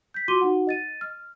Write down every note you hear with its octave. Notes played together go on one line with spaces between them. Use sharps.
G6 B6
F4 F#4 C6 D6 D#7 G7
D#4 F#4 F#5
D#5 A6 D#7
F6